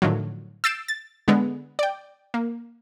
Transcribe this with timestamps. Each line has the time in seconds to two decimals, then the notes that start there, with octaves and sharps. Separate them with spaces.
0.02 A2 D3 D#3 F3 F#3
0.64 E6 G6 A6 C7 D7 E7
0.88 A6
1.28 D3 G#3 B3
1.79 D5 G5
2.34 A#3